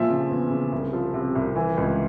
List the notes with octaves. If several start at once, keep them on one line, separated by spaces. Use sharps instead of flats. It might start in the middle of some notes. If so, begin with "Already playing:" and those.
Already playing: A#2 F3 E5
C#3
E2
C#3
C2
F3
C3
C2
E3
C#2